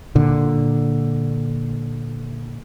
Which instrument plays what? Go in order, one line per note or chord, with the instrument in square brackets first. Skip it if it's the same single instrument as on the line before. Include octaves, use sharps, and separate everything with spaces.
[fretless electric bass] A#2 D3